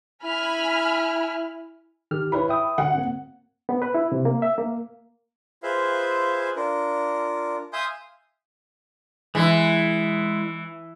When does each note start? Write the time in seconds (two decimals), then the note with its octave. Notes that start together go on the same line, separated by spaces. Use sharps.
0.24 E4 G#5 B5 F6
2.11 D#3 G4 F6
2.32 E4 B4 C#5 B5
2.49 E5 G5 D#6
2.78 D3 F#4 F#5
2.95 A#3 C4
3.69 B3
3.82 B4
3.94 E4
4.12 C3
4.25 A#3
4.42 E5
4.58 A#3
5.63 F4 G#4 B4 C5 E5 F5
6.56 D4 F4 A#4
7.73 E5 F5 G#5 C6 D#6 G6
9.35 E3 G#3 E4